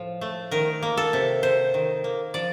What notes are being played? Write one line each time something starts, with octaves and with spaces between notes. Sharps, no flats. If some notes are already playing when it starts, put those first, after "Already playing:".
Already playing: A2 F3
A3
D#3 A#4
A#3
A4
C3
C3 C5
D#3
A#3
F3 D5